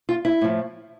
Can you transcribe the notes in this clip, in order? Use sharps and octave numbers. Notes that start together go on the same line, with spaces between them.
F4
E4
A2 F3